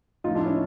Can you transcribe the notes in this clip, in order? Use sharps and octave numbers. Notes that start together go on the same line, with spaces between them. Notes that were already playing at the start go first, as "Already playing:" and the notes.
A2 F3 D#4 F4
D4 E4
C#4 D#4